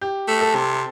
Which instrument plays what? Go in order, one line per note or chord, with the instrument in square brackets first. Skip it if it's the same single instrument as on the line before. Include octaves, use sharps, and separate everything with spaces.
[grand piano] G4
[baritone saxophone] A3
[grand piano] A4
[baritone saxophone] C3